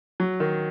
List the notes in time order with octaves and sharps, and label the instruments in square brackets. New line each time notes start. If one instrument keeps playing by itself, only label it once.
[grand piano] F#3
D#3